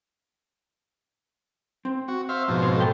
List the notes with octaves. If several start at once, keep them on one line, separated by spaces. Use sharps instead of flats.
C4
F#4
C5 E5 F5
G#2 B2 F3
C4 C5 C#5
A4 G5